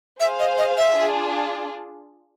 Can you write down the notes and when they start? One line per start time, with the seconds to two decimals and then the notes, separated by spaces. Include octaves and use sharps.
0.20 G#4 C5 E5 F5
0.39 D#5
0.58 D#5
0.77 E5
0.95 D4 F4 G#4